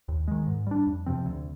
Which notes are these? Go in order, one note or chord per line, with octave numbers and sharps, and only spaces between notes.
D#2
D#3 G#3
G#2
G3 D4
F2
C3 F3 C4
D2